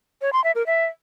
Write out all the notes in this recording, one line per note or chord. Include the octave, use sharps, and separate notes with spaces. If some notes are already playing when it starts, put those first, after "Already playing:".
C#5
C6
E5
A#4
E5